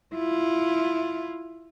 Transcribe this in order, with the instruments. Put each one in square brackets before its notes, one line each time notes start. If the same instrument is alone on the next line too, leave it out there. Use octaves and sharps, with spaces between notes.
[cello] E4 F4